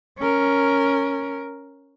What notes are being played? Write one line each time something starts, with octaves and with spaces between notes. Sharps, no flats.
C#4 A#4